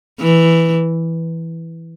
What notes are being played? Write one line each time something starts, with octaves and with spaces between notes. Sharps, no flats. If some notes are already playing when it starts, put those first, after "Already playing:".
E3